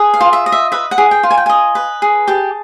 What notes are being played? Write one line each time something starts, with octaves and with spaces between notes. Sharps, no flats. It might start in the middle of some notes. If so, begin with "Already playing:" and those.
Already playing: G#4 B4
F5
F4
E5
D#5
E5
B4 E5
F#5
G#4
G5
F4
G#5
G5
D#5 G#5
B4
G#4
G4 A5